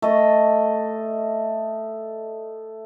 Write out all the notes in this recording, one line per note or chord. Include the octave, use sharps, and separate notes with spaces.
A3 D#5